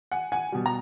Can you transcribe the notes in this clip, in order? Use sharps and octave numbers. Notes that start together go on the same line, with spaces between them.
F#5 G#5
F#5 G#5
B2 G3
A#5